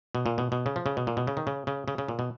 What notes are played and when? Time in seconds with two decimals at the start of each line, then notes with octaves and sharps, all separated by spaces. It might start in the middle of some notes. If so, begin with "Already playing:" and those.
0.15 B2
0.26 A#2
0.38 B2
0.52 B2
0.66 C#3
0.76 F3
0.86 C#3
0.97 B2
1.07 A#2
1.17 B2
1.27 C#3
1.37 D#3
1.47 C#3
1.67 C#3
1.88 C#3
1.98 C#3
2.08 A#2
2.19 B2